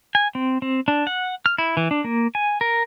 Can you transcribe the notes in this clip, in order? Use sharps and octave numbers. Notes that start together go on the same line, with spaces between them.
G#5
C4
C4
D4
F#5
F6
E4
E3
D4
A#3
G#5
A#4